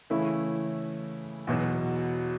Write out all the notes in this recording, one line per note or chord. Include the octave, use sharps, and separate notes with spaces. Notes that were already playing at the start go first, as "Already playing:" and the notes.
C#3 E3 A3 C#4 E4
E2 B2 F#3